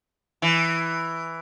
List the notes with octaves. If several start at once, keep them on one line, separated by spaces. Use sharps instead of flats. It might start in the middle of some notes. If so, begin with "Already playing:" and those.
E3